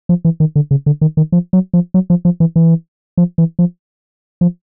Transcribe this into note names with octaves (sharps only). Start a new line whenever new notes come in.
F3
E3
D#3
D3
C#3
D3
D#3
D#3
F3
F#3
F3
F#3
F3
F3
E3
E3
F3
E3
F3
F3